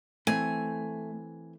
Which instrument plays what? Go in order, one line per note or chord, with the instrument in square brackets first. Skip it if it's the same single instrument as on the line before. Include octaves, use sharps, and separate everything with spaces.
[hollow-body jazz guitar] E3 C4 [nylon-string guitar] A3 [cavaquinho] G#5